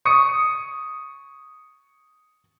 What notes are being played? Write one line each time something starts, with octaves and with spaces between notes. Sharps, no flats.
C#6 D#6 C#7